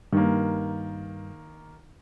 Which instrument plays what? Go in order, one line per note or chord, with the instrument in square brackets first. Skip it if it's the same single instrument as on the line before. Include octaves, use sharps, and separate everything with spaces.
[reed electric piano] G2 [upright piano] D#3 A#3